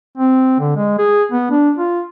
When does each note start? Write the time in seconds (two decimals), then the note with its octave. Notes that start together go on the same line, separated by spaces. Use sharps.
0.17 C4
0.59 D3
0.76 G#3
0.98 G#4
1.32 B3
1.51 D4
1.77 F4